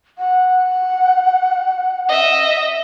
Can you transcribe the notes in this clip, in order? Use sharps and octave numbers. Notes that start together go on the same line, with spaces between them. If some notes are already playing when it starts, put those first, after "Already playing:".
F#5
D#5 E5